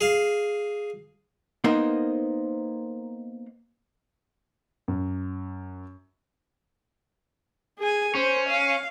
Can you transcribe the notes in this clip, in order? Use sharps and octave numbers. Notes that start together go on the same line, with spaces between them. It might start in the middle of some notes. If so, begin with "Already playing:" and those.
G#4 F5
A#3 B3 D#4 A#4 C5
F#2
G#4 G#5
C#4 C5
F5